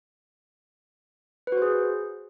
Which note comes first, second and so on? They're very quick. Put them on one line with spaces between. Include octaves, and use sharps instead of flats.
B4 F#4 C5 G#4